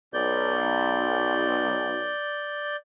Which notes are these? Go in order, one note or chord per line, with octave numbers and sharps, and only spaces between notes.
B1 D5 G6